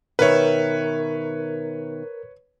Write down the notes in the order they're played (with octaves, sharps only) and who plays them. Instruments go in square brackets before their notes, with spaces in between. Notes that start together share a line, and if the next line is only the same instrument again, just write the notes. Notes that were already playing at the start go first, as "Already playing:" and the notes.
[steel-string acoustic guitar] B2 D#3 E5 [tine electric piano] A#4 [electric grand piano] B4 C#5